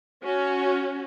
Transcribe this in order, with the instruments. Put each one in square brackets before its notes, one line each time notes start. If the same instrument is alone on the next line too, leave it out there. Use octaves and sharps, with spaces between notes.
[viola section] C#4 F#4